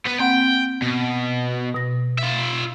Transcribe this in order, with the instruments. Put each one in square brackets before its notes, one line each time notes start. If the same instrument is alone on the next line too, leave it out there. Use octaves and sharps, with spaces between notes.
[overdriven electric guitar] B3 B4
[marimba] A#3 C4 F#5 [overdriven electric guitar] G5
[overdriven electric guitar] B2
[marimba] B2 A#6
[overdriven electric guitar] F4 E5